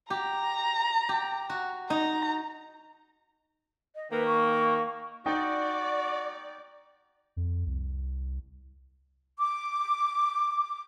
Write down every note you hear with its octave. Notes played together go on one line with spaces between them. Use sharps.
G4 A#5
G4
F#4
D#4 A#5
D#5
D#3 A#3 B4
C#6
D#4 F#4 D5 G5
F2
C2
D6